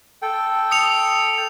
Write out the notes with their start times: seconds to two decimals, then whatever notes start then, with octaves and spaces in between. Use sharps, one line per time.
0.22 A4 G5
0.71 D#6 C#7 F7